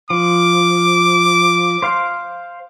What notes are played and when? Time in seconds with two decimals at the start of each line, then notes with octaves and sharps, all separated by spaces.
0.10 F3 D6
1.82 C5 F5 C6